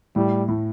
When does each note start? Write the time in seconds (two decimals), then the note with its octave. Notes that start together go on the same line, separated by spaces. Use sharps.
0.16 A2 G3
0.48 A2